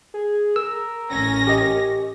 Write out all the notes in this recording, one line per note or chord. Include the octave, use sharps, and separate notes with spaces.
G#4
A#4 E6
A1 C#4 A#6
G4 D#5